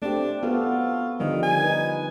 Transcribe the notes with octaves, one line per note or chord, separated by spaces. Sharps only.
A3 C4 D4 G4
B3 F4 F#4 A4
D3 D#3 F3 G3
G#5
D#4 B4